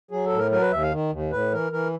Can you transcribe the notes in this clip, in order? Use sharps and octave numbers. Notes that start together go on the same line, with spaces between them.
F#3 G#4
A4
A2
A#4
F#3 A#4
B4
D#2 E5
F5
D#3
D#2
A2 B4
E3 A#4
E3 A#4